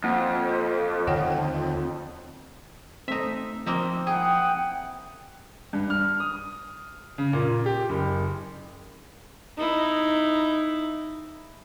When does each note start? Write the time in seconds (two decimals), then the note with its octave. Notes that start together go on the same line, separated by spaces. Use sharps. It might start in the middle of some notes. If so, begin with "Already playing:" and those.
0.04 F2 A#3
1.07 D#2 D3 D#3 C#5 F#5 G5
1.32 G5
3.08 A3 C4 D#4 E5
3.66 F3 A#3 C4 D#4
4.07 E4 G#4 F#5 G5 D#6
5.73 G2
5.90 F6
6.20 D#6
7.18 C#3
7.33 A#2
7.66 G4
7.89 F#1
9.58 D#4 E4